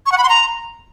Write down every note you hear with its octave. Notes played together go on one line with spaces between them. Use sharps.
C#6
F#5
B5
C6
A#5